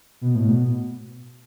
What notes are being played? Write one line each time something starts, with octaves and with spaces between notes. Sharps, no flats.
B2
A2
B2